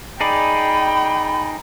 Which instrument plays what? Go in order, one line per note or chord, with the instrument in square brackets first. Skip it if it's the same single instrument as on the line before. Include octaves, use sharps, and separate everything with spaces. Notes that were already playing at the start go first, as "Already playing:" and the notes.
[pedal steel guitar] D#4 G#4 D5 [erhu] G5 [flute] B5